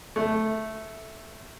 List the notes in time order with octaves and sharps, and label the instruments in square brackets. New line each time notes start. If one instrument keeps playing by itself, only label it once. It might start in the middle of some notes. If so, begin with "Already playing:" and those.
[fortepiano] A3